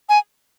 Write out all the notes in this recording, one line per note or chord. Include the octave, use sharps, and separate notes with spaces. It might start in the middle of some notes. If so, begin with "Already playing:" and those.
G#5